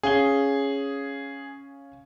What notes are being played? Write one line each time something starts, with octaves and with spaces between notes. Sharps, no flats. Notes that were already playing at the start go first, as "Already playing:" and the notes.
C#4 G#4 F5 G7